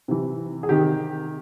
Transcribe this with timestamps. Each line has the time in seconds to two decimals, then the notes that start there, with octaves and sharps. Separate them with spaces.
0.08 C3 E3
0.63 G#4
0.69 C3 D#3 G4